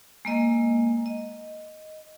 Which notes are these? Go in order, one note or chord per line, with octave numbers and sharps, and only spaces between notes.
G#3 A#3 D#5
D#5